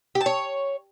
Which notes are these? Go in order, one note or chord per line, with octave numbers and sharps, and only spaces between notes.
G4
A5
C#5